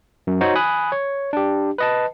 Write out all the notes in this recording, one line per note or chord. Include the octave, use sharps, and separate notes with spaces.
F#2
D#4 F#4 C5 C#5
G#5 B5 D#6 F#6
C#5
D4 G4
B4 D#5 A5